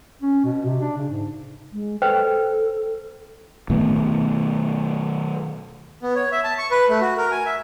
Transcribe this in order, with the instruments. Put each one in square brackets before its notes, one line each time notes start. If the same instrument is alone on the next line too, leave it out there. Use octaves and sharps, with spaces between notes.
[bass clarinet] C#4
B2
C3
D4
C#3
G#2
[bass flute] G#3
[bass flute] A4 [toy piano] B4 C5 G5
[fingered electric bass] B2 D#3 A3 B3
[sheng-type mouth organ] B3
C#5
E5
A5
C#6
B4
A3
F#4
A#4
G#5
E5